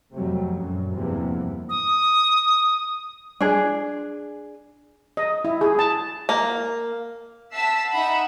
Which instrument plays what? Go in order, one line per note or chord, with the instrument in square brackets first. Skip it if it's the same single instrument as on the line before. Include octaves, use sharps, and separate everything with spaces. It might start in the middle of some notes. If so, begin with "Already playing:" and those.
[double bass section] F2 C3 F#3 G3 A3
F#2 A#2
E2 G2 C3 E3 F3 A#3
[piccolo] D#6
[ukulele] D4 G#4
[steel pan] D#5
E4
G#4
A5
[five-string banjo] A#3
[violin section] E5 F#5 A5 E6 B6 C7
D#4 E5 F#5 B5